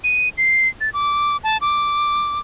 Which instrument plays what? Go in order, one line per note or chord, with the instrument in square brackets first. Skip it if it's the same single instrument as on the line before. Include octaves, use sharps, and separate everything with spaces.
[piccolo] D#7
C7
A6
D6
A5
D6